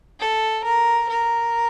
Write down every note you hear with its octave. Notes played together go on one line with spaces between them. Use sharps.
A4
A#4
A#4